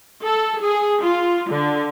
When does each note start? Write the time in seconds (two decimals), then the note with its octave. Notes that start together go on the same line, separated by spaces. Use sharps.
0.22 A4
0.62 G#4
1.02 F4
1.50 D3